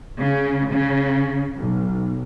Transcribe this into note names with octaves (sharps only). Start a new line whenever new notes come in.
C#3
C#3
B1